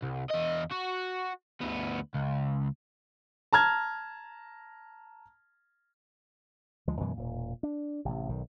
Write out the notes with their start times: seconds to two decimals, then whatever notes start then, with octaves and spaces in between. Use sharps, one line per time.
0.03 C2
0.30 E2 D#5
0.72 F#4
1.61 D2 B3
2.14 C#2
3.53 A5 A#5 F6 G#6
6.87 D2 F3 G#3
7.00 F#2 B2 E3 G#3
7.17 E1 A#2
7.63 D4
8.05 A1 C3
8.29 B1 D#3